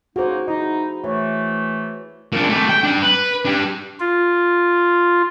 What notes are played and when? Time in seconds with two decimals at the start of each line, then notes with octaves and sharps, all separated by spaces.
0.16 C#3 A#3 D#4 F#4 G#4 C5
0.48 D#4 E4 F#4
1.04 E3 A3 C#5
2.32 A#2 D4
2.49 A3 G4
2.69 G5
2.84 D4 G5
3.02 B4
3.45 D4 G4
4.00 F4